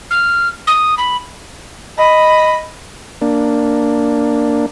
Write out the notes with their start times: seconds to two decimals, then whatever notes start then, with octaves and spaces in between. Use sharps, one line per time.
0.11 F6
0.67 D#6
0.98 B5
1.99 D#5 B5
3.21 A#3 D4